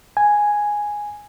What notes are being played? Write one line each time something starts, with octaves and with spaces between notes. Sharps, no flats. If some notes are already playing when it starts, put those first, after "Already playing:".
G#5